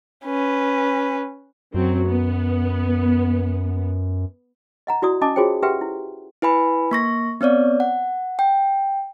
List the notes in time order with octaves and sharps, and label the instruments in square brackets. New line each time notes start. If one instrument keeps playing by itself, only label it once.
[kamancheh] C#4 B4
[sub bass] F#2 [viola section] F#3 C4
[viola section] B3
[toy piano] D#5 F#5 A#5
E4 F#4 D5 D#6
C#4 D#5 G#5 A5 D6 D#6
F4 F#4 G#4 C5 C#5 G5
G4 B4 E5 F#5 G5 C6
E4
[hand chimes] E4 B4 G#5 B5
A#3 C#6 A#6
B3 C4 C#5 D5
F#5
G5